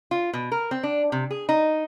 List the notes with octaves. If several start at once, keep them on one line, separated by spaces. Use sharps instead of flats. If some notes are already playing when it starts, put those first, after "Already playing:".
F4
B2
A#4
C4
D4
C3
G#4
D#4